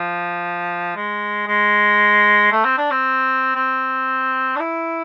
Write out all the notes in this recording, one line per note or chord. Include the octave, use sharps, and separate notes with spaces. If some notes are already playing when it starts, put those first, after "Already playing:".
Already playing: F3
G#3
G#3
A3
C4
D4
C4
C4
D4
E4